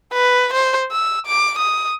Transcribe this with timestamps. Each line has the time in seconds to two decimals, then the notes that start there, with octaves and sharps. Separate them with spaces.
0.13 B4
0.53 C5
0.92 E6
1.27 D6
1.59 D#6